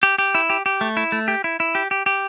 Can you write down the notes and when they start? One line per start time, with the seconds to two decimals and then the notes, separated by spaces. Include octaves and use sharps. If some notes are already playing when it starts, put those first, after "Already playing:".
0.03 G4
0.18 G4
0.35 E4
0.50 G4
0.66 G4
0.81 A3
0.97 E4
1.12 A3
1.28 G4
1.44 E4
1.60 E4
1.75 G4
1.91 G4
2.06 G4